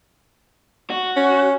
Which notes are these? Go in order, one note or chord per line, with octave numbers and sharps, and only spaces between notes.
F#4
C#4